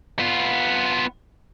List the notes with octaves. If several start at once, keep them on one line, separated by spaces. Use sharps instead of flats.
B3 F4